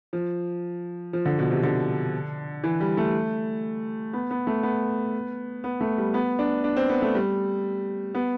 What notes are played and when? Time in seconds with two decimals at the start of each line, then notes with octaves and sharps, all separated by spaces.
0.13 F3
1.13 F3
1.25 D3
1.39 B2
1.51 C3
1.63 D3
2.63 E3
2.80 G3
2.97 A3
4.13 B3
4.31 B3
4.47 A3
4.63 B3
5.64 B3
5.80 A3
5.98 G3
6.14 B3
6.39 D4
6.64 D4
6.76 C4
6.89 B3
7.02 A3
7.15 G3
8.15 B3